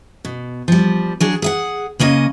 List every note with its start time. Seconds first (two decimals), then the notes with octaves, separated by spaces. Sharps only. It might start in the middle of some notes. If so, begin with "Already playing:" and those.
0.25 B2
0.68 F3 G3
1.20 F#3 D4 G#4
1.42 G#4 F5 F#5
1.99 C#3 A#3 C#4 D#5